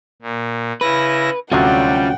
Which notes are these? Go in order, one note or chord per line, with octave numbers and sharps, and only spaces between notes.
A#2
C#3 E4 B4 A#6
D2 C3 F#3 G3 C#4 F4 F#5 G5